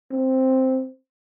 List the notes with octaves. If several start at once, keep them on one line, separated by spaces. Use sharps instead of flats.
C4